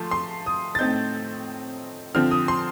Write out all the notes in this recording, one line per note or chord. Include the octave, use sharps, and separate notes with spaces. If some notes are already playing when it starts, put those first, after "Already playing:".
Already playing: F3 A3 A5 C6
C6
D#6
A6
A2 A3 C4 D#4 G6
D3 F3 C4 F6
D#6
C6